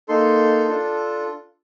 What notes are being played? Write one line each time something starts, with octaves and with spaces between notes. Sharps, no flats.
A#3 D#4 A4 C6
D4 F4 A4